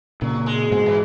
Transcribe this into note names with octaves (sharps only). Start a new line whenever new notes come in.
A#2 C#3 F#3
G#3
G#2 B2 G#3
E3